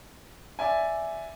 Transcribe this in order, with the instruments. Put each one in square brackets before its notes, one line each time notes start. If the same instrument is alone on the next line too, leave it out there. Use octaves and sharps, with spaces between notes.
[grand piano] D5 E5 G#5